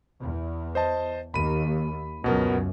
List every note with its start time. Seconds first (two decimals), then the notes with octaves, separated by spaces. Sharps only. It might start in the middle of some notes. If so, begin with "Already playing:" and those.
0.22 E2
0.75 C5 D#5 A5
1.34 D#2 B5 D#7
2.24 C#2 F#2 B2 B3 A#4